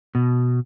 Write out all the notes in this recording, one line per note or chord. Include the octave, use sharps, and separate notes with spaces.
B2